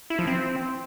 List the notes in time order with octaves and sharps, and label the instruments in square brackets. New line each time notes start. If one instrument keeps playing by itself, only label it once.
[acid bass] E4
F3
C4